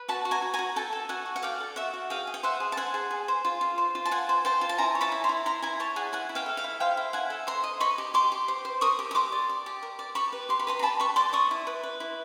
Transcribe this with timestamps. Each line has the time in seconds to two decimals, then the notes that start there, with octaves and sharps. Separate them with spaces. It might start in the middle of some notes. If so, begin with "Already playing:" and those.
Already playing: B4
0.08 F#4 A5 B5
0.25 F#4
0.31 G#5 A#5
0.42 F#4
0.54 G#5 A#5
0.59 F#4
0.76 A4 G5 A5
0.93 A4
1.09 F#4 F#5 G#5
1.26 F#4
1.36 F#5
1.43 D5 F5 G5
1.60 A4
1.76 F#4 E5 F#5
1.94 F#4
2.10 G#4 F5 G5
2.27 G#4
2.34 G5
2.43 C5 E5 F#5
2.60 G#4
2.72 A5
2.77 C5 F#5 G#5
2.94 G#4
3.11 G#4
3.28 C5
3.45 F4
3.61 F4
3.78 C5
3.95 F4
4.06 A5
4.11 F4 F#5 G#5
4.29 C5
4.45 C5 G5 A5
4.61 F4
4.69 A5
4.78 E4 G#5 A#5
4.95 C#5
5.01 A5 B5
5.12 E4
5.24 A#5 C6
5.29 E4
5.46 E4 A#5 C6
5.62 E4 G#5 A#5
5.80 C#5 G5 A5
5.96 G#4 F#5 G#5
6.12 E4 F#5 G#5
6.29 E4
6.35 F5 G5
6.46 A4
6.57 F5 G5
6.64 E4
6.80 C5 F5 G5
6.97 E4
7.13 E4 F#5 G#5
7.30 A4
7.47 C5 A#5 C6
7.64 D#5
7.80 D#5 B5 C#6
7.98 G4
8.14 G4 C6 D6
8.32 G4
8.48 C5
8.65 C5
8.81 A#4 C#6 D#6
8.99 G4
9.11 D#6
9.15 G4 C6 D6
9.32 D5
9.49 D5
9.66 G4
9.83 A#4
9.99 D5
10.15 G4 B5 C#6
10.33 B4
10.49 G4 C6
10.59 B5
10.67 B4 A#5 C6
10.79 A#5
10.83 G4 A5 B5
11.00 B4 B5 C#6
11.16 D5 C6 D6
11.33 D5 C#6 D#6
11.51 E4
11.67 B4
11.84 B4
12.00 E4